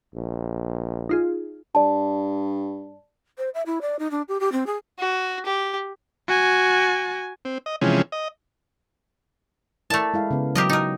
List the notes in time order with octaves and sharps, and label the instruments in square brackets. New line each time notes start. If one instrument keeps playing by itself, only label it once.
[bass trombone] A#1
[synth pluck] D#4 F4 G#4
[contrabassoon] G2 [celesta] D5 A5
[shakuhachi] C5
E5
E4
D5
D#4
D4
G4
G4
C4
G#4
[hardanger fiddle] F#4
G4
[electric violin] F#4 G#5
[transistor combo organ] C4
D#5
C3 E3 F3 G#3 C#4
D#5
[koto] A3 A5 [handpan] E4 A#4 D5
[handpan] G#3 E4 F5
C#3 B3
[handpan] F#3 [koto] G4 A#4 D#5
[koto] D#4 A#4